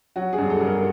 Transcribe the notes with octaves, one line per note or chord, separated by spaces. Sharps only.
F#3 F#4
G#4
G2
A4
G2
A#4